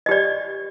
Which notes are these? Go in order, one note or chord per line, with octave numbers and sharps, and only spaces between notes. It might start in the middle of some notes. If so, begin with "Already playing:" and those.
G4 D5 D#5